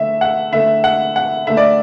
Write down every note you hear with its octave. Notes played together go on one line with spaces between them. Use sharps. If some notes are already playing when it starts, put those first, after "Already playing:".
Already playing: D3 A3 E5
F#5
D3 A3 E5
F#5
F#5
D3 A3 E5
D5